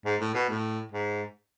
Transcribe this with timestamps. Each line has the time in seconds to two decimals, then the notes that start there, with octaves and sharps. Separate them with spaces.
0.05 G#2
0.20 A2
0.34 B2
0.49 A2
0.92 G#2